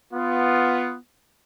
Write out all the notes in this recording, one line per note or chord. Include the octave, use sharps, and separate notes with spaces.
B3 F4